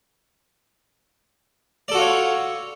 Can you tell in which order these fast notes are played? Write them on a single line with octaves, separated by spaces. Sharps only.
D5 A4 F#4 F4 C#5